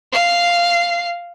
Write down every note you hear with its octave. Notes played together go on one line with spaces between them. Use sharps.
F5 C7